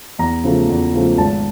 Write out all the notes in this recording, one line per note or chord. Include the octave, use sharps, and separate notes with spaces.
E2 A#5
C#3 F3 A3
E2
C#3 F3 A3
G#1 A5